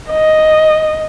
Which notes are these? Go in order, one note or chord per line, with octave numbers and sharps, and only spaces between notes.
D#5